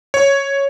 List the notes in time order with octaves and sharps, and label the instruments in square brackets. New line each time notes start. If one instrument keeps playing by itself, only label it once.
[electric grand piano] C#5